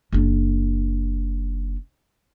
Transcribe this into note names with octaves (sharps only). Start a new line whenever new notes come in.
F#1 D4